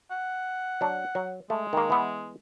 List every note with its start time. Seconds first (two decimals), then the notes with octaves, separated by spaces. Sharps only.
0.11 F#5
0.81 F#3 D4
1.15 F#3
1.50 G#3 A3
1.73 D#3 A#3
1.90 E3 B3